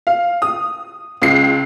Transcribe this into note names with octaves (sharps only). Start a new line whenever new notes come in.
F5
D#6
C#2 C7